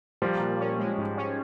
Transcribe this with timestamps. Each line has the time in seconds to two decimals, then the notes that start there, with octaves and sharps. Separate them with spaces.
0.22 F3 G3 A#3
0.40 A#2
0.59 C#4
0.79 G#3
0.98 G#2
1.17 C#4